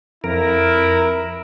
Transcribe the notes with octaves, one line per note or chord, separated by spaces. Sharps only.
F2 E4 A#4